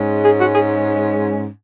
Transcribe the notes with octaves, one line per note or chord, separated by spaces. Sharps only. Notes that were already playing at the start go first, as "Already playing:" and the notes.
Already playing: G#2 G#3 C#4
G#4
F#4
G#4